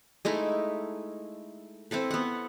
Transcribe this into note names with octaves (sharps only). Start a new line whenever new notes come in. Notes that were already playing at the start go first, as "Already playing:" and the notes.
G#3 A3 D#4 E4
C4 E4 A4 B4
B3 F#5